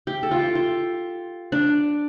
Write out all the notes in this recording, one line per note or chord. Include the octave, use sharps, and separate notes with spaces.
G4
A4
F4
G4
F4
D4